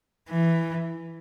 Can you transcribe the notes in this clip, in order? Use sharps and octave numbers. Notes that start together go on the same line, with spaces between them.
E3